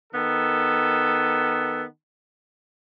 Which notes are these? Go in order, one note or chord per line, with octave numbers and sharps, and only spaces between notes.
D#3 B3 A4